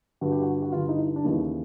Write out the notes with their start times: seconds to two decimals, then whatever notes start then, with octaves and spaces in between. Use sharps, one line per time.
0.21 G2 D3 F#4
0.32 G4
0.42 F#4
0.62 F#4
0.72 G2 D3 F4
0.89 D#4
0.99 E4
1.16 D4
1.24 D#2 C#3 E3 D#4